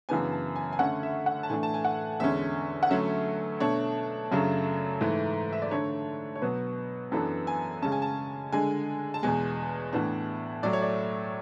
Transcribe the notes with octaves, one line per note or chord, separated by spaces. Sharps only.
F#2 C#3 E3 B3 D4 G#5
A5
G#5
G#5
D3 A3 C#4 F#5
E5
F#5
A5
A2 E3 A3 D4 G#5
A5
G#5
F#5
E2 D3 G#3 C#4 E5
F#5
D3 F#3 A3 C#4 E5
B2 A3 D4 C#5
F#2 C#3 F#3 A3 D4
G#2 E3 A3
E5
D5
D3 A3 D4 C#5
C#5
B2 F#3 B3 B4
F#2 E3 B3 D4 A4
G#5
C#3 G#3 C#4 A5
G#5
A5
D3 G#3 D4 G#5
A5
E2 B2 G#3 G#5
A2 E3 B3 D4
A2 F#3 A3 D5
C#5
D5